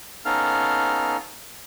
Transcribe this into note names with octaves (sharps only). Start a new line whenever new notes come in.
B3 C#4 D#4 A4 F5 F6